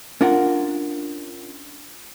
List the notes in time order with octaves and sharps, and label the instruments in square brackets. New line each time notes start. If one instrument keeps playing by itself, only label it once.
[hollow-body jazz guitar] C#4 D4 F4 A#4 F#5